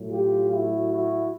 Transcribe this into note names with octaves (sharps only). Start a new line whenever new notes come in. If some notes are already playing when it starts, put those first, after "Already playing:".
Already playing: A2 F#3
F4 G4
E4 F#4
E4 F#4